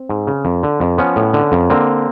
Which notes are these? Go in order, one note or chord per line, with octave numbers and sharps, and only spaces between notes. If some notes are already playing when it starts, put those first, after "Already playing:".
Already playing: C4
G#2
C#3
F2
D3
F2
F3 B3 C#4
A2
D3
F2
D3 A#3 C4